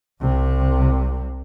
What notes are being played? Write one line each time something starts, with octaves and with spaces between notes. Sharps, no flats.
C2 C3